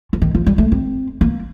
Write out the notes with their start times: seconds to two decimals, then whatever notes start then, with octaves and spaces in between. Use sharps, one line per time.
0.13 F3
0.22 D#3
0.35 F3
0.46 G3
0.58 A3
0.72 C4
1.21 A#3